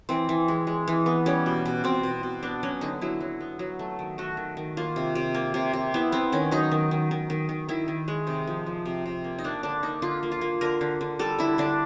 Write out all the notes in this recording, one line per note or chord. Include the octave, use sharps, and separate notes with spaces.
E3 C4
E3
G#3
G#3
E3
B3
G3 C#4
B2
B2
B2 C4
B2
B2
B3 D4
F#3 C#4
D3 D#4
F#3 E4
F#3
B3
F#3
A3
D#3
A3 F#4
D#3
D#3
A#3 F4
C3
C3
A#3
C3
C3
B3 E4
B3 C4
D#3 C#4
F#3 D#4
D#3
D#3
D#3
D#3
D#3
D#3 E4
D#3
G#3
C3 D#4
F3
F3
C3
C3
A#3
D#4
A#3 D4
D3 D4
A#3 D#4
D3 F4
A#3
F4
A#3
D3 A#4
D3
D3
G3 A4
D3 E4
D3 D4